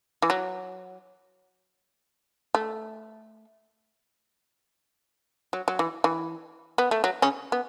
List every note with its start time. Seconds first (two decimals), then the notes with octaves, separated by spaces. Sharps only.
0.22 E3
0.30 F#3
2.55 A3
5.53 F#3
5.68 F#3
5.79 E3
6.04 E3
6.78 B3
6.91 A3
7.04 F#3
7.22 C#3 C#4
7.52 B3